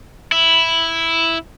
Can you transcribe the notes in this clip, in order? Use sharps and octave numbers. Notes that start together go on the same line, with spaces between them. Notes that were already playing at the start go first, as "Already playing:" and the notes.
E4